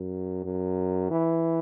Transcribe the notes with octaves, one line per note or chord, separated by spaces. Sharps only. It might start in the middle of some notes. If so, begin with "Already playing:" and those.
Already playing: F#2
F#2
E3